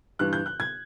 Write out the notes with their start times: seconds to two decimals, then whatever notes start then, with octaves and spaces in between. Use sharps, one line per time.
0.19 G2 E3 F#6
0.33 G6
0.46 F#6
0.60 G#6